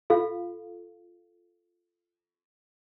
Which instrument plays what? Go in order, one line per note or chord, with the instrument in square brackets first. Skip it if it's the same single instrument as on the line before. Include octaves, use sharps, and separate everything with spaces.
[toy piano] F4 A4 F5